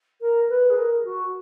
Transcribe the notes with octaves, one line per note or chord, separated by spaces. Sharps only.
A#4
B4
G#4
A#4
F#4